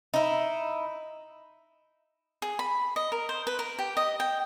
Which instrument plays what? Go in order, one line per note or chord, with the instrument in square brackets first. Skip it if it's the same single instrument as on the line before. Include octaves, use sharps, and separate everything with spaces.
[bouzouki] D#4 E4
[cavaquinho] G#4
B5
D#5
A#4
C5
B4
A#4
G4
D#5
G5